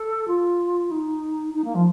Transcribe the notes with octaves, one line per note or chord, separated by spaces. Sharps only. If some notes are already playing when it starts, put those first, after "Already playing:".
Already playing: A4
F4
D#4
D#4
A#3
F3